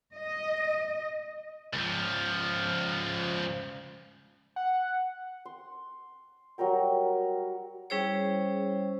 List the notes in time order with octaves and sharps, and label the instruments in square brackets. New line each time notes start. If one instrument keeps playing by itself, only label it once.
[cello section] D#5
[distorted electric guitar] C#2 F3
[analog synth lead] F#5
[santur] C6
F#3 G3 A#4 G5
[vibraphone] G3 C#4 E4 G#4 C5 C#5